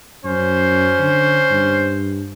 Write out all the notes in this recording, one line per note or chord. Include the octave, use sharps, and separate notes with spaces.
F#2 C#4 C5
D3
G2